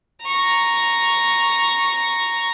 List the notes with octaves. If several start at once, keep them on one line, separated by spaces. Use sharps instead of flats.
A#5 C#6